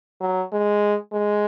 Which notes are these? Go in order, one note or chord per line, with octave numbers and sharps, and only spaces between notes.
F#3
G#3
G#3